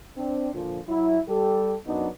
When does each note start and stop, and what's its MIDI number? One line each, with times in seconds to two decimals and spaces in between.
0.17 0.49 60
0.17 0.49 62
0.53 0.80 46
0.53 0.80 50
0.53 0.80 53
0.88 1.18 54
0.88 1.18 64
1.28 1.75 55
1.28 1.75 67
1.28 1.75 69
1.87 2.07 42
1.87 2.07 54
1.87 2.07 59
1.87 2.07 62
1.87 2.07 63